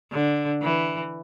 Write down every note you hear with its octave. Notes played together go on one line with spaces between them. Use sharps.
D3
E3